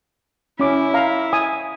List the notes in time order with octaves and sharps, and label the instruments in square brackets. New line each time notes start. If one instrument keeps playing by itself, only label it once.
[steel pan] C#4 D6 [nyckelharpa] E4
[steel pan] F5 A#5
G#5 D#6